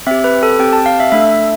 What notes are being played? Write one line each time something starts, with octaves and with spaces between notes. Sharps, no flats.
C4 G4 E5
B4
A4
C4 G4 G5
A5
F5
E5
A3 D4 A4 E5